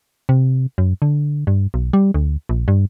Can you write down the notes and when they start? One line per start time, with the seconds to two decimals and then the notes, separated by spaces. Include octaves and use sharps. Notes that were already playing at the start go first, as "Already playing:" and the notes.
0.29 C3
0.78 F#2
1.02 D3
1.47 G2
1.74 B1
1.93 G3
2.14 D2
2.49 A#1
2.68 G2